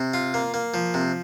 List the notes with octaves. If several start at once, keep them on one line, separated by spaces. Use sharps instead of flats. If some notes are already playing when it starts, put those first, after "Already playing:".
Already playing: C3
F4
A#3
A#3
F3
C3